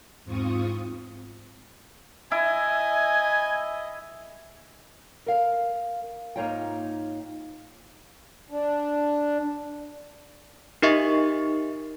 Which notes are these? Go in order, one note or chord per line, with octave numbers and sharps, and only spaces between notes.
E2 G#2 C4 F4 C#6 D#6
E4 D#5 G#5
A#4 F5
G#2 A#3 D#4 F4 C#5 G5
D4
D#4 G4 A#4 D#5 E5 C#6